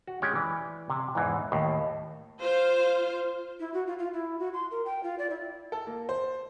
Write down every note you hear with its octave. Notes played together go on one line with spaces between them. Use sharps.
F#4
G#3 C#4 G4 C#5
E3 D5
C3
E2 G#2 E3
D#2 A2
F4 C5 F5
E4
F#4
F4
F4
E4
F#4
C6
A#4
G5
F4
D5
E4
A4
A#3
C5